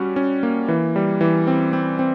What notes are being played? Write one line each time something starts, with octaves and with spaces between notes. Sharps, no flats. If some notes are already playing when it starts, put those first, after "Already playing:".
Already playing: G3 C#4 F#4
C#4
A#3
E3
G3
E3
C4
C4
C4